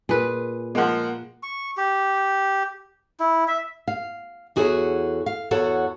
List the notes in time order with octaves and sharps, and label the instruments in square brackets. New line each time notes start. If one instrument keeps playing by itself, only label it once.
[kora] A#2 B4 [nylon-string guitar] G#4
[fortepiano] F3 G#3 [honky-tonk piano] A#3 F#5
[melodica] C#6
G4
E4
E5
[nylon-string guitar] F5
E2 F#4 G#4 A4 C#5
F5
E2 F#4 A4 C#5 F#5